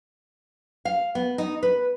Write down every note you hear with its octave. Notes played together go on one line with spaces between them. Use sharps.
F5
B3
D#4
B4